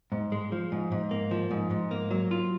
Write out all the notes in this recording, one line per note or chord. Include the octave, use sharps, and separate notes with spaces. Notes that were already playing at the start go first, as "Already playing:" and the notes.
G#2
G#3
F3
G#2
G#2
A#3
F3
G#2
G#2
A#3
F#3
F4